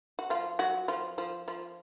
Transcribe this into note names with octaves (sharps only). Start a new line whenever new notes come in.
F#4
F3 F4
F#3 F#4
F3 F4
F3 F4
F3 F4